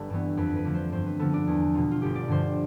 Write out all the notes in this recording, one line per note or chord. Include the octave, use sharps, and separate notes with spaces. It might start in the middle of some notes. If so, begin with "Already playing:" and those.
Already playing: G1 G3 A4 B4
G2 E3 B3
F2 B4
B4
D3 F3 A3
C5
G2 C5
B4
D3 F3 B3 A4
D4
E2
B2 B3 F4
F4
G1 G4
D5
G2 D3 F3 C5